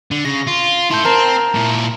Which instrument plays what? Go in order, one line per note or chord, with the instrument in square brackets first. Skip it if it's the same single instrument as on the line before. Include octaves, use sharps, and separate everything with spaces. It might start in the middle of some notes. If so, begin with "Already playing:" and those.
[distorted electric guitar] D3
[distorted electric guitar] C#3 [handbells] A#6
[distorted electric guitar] F4
[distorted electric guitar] E4 A4 [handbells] C6 G6
[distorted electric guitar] C4 [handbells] A#4 A5 A#5
[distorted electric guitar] A#2 E4